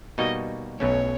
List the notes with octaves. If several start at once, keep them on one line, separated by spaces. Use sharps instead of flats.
B2 G3 A#3 D#4 F#4 D#5
B1 B2 F#3 A3 C#4 C#5